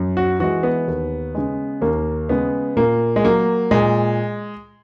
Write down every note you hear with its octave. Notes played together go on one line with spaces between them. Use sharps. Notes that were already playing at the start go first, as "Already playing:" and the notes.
Already playing: F#2
F#4
E3 G#3 F#4
B3
D#2
C#3 G#3
D#2 A#3
C#3 G#3 B3
A#2 A#3
G#3
F#3 A#3
A#2 G#3